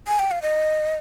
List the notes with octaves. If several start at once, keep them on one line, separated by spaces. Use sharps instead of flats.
G#5
G5
F5
D#5